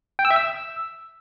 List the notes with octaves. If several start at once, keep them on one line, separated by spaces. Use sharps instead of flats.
G5
E6
E5
E6